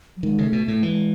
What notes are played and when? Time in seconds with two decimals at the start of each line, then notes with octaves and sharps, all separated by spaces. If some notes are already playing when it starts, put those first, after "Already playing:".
0.17 F#3
0.23 D#3 G#3
0.38 C#3 A3
0.53 B2
0.63 A3
0.68 A2
0.83 E3 G#3